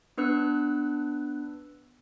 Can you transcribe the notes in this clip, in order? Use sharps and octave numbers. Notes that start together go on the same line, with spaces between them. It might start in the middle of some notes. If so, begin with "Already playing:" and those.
B3 D4 B4 E6 F#6